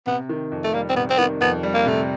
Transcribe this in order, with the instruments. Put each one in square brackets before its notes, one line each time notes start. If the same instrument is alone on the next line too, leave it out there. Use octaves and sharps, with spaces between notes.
[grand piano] C3 [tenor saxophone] B3
[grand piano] D#3
F2
[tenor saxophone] A3
[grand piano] G3 [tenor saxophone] A#3
[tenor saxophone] C4
[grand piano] C3 [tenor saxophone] B3
[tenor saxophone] C4
[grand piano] D#3 [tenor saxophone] B3
[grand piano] F2 [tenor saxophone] B3
[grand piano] G3
[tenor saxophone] A#3
[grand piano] C3 [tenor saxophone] A3